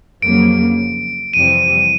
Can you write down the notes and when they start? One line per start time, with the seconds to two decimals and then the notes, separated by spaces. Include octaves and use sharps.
0.22 F2 C#3 F#3 A#3 D7
1.34 F2 C3 E3 G3 C4 D#7